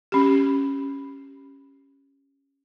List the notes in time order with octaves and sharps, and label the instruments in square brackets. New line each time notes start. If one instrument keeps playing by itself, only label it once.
[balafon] C#4 G4